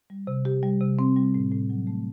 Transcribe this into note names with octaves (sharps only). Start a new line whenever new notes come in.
G3
C3
G4
G3
C3
C4
G3
A2
A2
F#3
A3